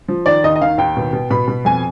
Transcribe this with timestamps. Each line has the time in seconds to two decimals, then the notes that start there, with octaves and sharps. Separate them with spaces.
0.08 F3
0.26 D#3 D5
0.44 D#2 D#5
0.56 D#5
0.61 D#3 F5
0.78 D#2 G5
0.97 B2
1.13 B2
1.31 B2 B5
1.48 B2
1.65 F2 G#5